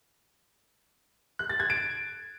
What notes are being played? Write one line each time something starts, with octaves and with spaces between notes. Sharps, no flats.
F#6
A6
G#6
D7